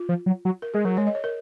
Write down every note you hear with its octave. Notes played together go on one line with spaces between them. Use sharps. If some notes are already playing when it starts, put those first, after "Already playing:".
Already playing: F4
F3
F#3
F#3
A#4
G#3 G#4
F#3 A#4
G#3 C#5
D#5
C#5
A#4